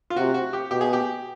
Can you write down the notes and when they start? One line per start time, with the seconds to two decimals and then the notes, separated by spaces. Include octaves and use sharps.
0.10 F4
0.16 C3 F#4
0.34 F#4
0.53 G4
0.71 B2 G4
0.81 G#4
0.93 G4